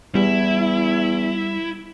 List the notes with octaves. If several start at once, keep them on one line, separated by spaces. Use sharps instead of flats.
E2 G3 E4